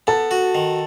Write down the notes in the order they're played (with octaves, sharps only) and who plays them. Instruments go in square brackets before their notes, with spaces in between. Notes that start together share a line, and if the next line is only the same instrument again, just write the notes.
[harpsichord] B3 [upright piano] A4 A5
[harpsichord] F#4
D#3